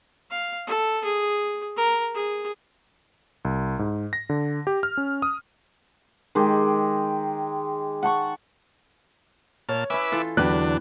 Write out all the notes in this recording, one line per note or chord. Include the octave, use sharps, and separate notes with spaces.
F5
A4
G#4
A#4
G#4
C2
G#2
A#6
D3
G4
F6
C#4
D#6
D#3 G#3 G4
F#5 A5 C#6
A#2 C#5 A5 F6
C#4 E4 B4 E5 D6
E3 F4 A4
E2 D3 F#3 B3 D4 G4 B4 F#6